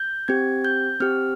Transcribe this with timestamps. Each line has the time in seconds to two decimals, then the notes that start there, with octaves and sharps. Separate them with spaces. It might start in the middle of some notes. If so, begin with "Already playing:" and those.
Already playing: G6
0.28 C4 G4 G#6
0.65 G6
1.00 C4 G4 F6